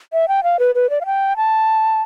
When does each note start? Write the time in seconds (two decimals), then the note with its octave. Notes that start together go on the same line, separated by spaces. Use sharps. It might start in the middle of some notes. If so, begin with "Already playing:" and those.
0.13 E5
0.28 G5
0.44 F5
0.59 B4
0.75 B4
0.90 D5
1.01 F5
1.06 G5
1.37 A5